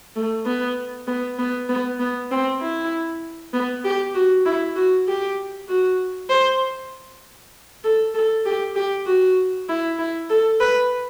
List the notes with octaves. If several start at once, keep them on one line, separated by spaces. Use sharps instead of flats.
A3
B3
B3
B3
B3
B3
C4
E4
B3
G4
F#4
E4
F#4
G4
F#4
C5
A4
A4
G4
G4
F#4
E4
E4
A4
B4